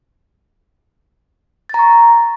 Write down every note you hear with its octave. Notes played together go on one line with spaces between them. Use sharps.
A#5 C#6 A6